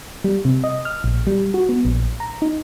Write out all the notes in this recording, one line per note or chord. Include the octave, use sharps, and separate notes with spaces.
G3
C3
D#5
F6
A#1
G3
F#4
B3
A#1
A#5
D#4